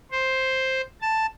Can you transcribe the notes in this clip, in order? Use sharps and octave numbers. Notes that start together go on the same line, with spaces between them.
C5
A5